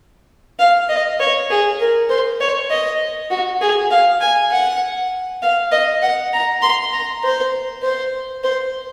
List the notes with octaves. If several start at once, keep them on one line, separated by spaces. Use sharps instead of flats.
F5
D#5
C#5
G#4
A#4
C5
C#5
D#5
F#4
G#4
F5
G#5
F#5
F5
D#5
F#5
A#5
C6
A#5
C5
C5
C5